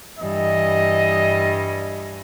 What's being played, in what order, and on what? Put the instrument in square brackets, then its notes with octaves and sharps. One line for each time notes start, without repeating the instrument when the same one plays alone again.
[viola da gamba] G2 E3 [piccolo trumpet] D#5